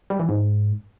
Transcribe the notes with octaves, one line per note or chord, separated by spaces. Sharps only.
G3
E3
G#2